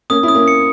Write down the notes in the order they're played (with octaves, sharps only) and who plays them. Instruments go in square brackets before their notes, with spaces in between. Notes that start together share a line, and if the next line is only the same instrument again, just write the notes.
[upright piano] A#3 C#4 [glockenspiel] D#6
[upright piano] C#4 E4
[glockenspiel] D#6
[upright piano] A#3 C#4
[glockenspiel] C#7